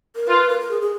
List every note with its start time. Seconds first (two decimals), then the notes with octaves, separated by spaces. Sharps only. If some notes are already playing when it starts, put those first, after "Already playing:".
0.16 A#4
0.27 F4 B4
0.49 A#4
0.60 A#4
0.71 G#4
0.82 G#4